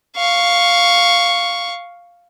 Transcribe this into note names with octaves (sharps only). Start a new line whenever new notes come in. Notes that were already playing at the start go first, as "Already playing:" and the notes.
F5 C#6